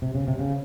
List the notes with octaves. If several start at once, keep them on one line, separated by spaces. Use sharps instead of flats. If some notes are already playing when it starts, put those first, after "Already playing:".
C3
C#3
C3
C#3